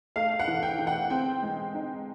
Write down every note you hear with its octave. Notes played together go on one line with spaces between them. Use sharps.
A3 F5
F#5
E3
G5
E3
F#5
C4 G5
G#3
D#4